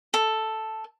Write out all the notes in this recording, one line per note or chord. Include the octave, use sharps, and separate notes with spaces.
A4